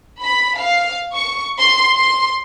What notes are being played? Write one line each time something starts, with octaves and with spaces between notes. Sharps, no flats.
B5
F5
C#6
C6
C6